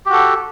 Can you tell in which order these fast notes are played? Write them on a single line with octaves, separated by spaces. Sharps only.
G4 F#4 A4